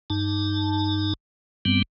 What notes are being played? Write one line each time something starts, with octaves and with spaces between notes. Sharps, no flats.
G2 D#4 A5
G2 G3 B3 C4